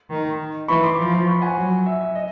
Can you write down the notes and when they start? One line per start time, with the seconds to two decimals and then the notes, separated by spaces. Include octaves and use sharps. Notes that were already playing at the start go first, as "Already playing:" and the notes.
0.10 D#3
0.68 E3 B5 C#6
0.83 C6 D6
0.98 F3
1.27 B5 C#6
1.42 F#5 G#5
1.57 F#3
1.86 E5
2.01 E5
2.15 D#5